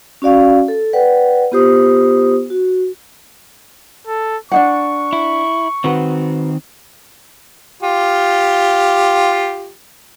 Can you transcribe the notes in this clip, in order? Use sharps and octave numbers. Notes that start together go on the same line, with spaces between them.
C#4 F#4 D5 F5 C#6
A4
B4 D5 F#5 G5
B3 F4 G4 C5 D#6
F#4
A4
D4 D#4 F#5 C#6
E4
D#3 C4 F#4 B4
F4 G4